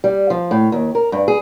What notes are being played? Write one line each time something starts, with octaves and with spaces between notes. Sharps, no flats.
G3
F3
A2
D#2
A#4
G2
G#4